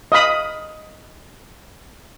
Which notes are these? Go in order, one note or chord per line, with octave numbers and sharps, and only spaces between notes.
D#5 F5 B5 D#6